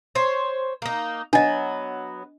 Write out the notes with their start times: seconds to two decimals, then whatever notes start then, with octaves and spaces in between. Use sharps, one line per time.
0.15 C5 C#5
0.82 A#3 D#4
1.33 F#3 B3 D4 D#5